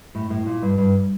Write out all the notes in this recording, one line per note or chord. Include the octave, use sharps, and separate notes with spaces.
A2
A2
A#2
G2
G2